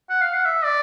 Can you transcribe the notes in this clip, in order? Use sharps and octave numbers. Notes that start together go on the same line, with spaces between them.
F#5
F5
F#5
E5
D5